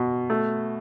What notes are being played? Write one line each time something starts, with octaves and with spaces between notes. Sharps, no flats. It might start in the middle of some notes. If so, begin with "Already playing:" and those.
Already playing: B2
A3